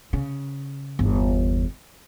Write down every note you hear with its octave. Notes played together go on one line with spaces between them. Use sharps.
C#3
G1 E2